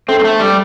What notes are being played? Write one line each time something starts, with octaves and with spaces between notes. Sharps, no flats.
C4 D4 A4 E5 A5
C4
A3
G3